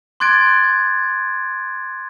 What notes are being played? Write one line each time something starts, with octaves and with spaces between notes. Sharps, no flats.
C6 D6 F#6 G#6 A6 D7